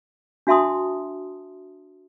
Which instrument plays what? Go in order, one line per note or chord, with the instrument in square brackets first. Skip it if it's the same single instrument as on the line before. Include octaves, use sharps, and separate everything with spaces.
[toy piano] D4 F#4 E5 A5 C6 D#6